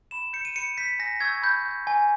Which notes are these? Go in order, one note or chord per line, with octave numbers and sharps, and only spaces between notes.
B5 E7
G6 C#7
D#7
B5 C#7
G6 B6
G#5 A#6
C#6 E6 G6 G#6
B5 G6
G6
G#5